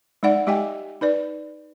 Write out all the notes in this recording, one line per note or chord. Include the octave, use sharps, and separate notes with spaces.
G#3 D#4 D5 F#5
G#3 G4 D#5 G5 G#5
D#4 B4 D5